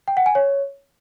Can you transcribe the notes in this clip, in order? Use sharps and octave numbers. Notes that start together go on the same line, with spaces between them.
G5
F#5
G#5
C#5